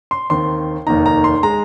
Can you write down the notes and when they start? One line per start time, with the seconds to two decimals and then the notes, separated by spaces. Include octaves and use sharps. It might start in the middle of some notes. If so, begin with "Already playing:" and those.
0.11 C6
0.30 D#2 D#3 C4 C6
0.86 F1 D#2 D#3 A#3 D#4 A#5
1.06 A#5
1.24 C6
1.43 G#3 A#5